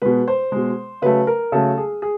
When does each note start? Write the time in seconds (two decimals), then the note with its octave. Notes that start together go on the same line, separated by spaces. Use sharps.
0.02 B2 G#3 B4
0.28 C5
0.52 B2 G#3
1.02 C#3 F#3 A3 B4
1.27 A#4
1.52 C#3 F#3 A3 A4
1.78 G#4
2.02 G#4